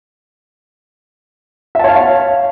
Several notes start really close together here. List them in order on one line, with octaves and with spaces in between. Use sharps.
E5 A5 C#5 F5